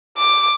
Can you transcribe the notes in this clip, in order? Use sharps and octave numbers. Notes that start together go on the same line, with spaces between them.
D6